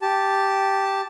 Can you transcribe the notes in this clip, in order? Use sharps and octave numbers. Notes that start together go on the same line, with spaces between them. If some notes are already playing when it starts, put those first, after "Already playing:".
G4 A5